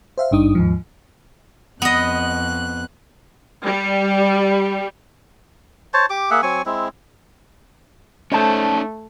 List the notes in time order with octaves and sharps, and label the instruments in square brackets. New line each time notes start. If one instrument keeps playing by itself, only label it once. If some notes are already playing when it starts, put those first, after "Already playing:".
[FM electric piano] C5 E5 F5
G#1 G2 D4 D#4 D#6
D#2 G#2 F3
[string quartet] F2 F#6 [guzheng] B3 D#5
[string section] G3
[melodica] C5 C#5 A5
G4 D6
A#3 G#4 E5 F#5
F#3 C4 G#5 C#6
G#3 C4 E4
[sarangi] A3 [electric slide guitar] C#4 D#4 C#5 [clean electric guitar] C5 A5